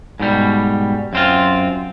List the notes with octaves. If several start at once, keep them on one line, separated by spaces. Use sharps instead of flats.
G#2 B2 G3
F#2 C4 F4